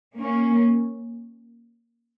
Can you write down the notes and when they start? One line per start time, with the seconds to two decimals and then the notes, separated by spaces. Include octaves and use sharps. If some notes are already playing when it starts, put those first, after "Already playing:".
0.18 A#3 C#4